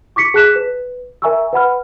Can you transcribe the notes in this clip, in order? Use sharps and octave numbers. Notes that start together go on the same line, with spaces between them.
C#6 D6 B6 C#7
G#4 A5 F#6 B6 E7
B4
A#4 E5 G#5 A#5 C#6 E6
B4 F#5 B5 F6